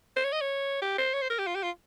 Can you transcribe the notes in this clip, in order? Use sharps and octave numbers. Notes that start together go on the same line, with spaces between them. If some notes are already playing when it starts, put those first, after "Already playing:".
C5
C#5
D#5
C#5
G4
C5
C#5
C5
A#4
G4
F4
G4
F4